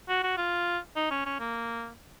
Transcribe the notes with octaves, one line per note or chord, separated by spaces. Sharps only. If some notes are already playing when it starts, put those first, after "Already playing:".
F#4
F#4
F4
D#4
C#4
C#4
A#3